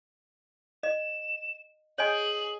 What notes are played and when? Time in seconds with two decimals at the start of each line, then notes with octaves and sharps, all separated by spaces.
0.83 D#5 E7
1.98 G#4 C#5 D#5 G#5 F#7